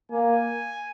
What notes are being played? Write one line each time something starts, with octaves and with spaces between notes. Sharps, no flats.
A#3 G#5